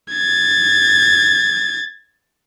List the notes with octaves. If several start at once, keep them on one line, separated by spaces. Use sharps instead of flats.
G#6 A6